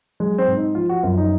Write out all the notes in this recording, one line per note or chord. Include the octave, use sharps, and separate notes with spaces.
F#3 G#3
C4
G#2
D#4
F3 F4
F#4
F#2 F4
D#4